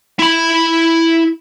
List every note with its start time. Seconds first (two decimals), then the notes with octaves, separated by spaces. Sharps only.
0.19 E4 B5